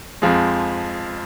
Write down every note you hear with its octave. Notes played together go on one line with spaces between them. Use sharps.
F2 F3 G#3